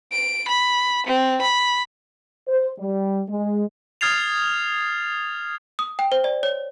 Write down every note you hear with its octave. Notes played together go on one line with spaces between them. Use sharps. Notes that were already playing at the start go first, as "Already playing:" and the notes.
D7
B5
C4
B5
C5
G3
G#3
D#6 F6 G#6 A6 C7 F7
D#6
G5
C5
D5
C#5